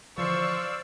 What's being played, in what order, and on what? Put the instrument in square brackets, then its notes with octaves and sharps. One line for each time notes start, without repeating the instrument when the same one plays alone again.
[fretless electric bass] D3 E3 F3 [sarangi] C5 [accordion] D5 F5 E6 [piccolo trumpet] C#6